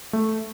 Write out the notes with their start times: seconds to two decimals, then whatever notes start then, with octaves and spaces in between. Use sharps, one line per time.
0.13 A3